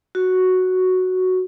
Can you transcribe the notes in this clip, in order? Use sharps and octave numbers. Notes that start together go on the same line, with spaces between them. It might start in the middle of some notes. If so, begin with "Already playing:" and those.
F#4